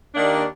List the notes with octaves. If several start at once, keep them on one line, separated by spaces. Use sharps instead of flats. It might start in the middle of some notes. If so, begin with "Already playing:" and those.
D#2 D#3 A#3 D4